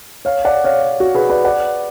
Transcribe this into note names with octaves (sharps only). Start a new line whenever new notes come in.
C#5 F5
D5 F#5
C#5 F5
F#4
G#4 B4
B4 D5
D5 F#5